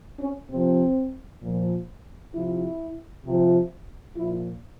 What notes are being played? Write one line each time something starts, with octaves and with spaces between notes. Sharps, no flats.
C#4
C3 F3 C4
A#2 F3
C3 F3 E4
C3 F3
A#2 F3 E4